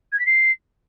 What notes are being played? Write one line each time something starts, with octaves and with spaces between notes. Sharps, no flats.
G#6
B6
C7